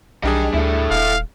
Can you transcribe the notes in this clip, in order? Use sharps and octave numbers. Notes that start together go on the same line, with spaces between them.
B1 G3 D4 G#4 D#5 G5
D2 E4 A4
D#1 F5